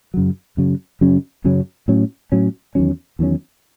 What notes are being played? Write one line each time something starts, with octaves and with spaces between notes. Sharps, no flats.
F#2 C#3 F#3
F#2 C#3 F#3
F#2 C#3 F#3 C#4
F#2 C#3 F#3 C#4
A2 F#3 C#4
A2 F#3 C#4
E2 D#3 F#3 C#4
E2 D#3 F#3 C#4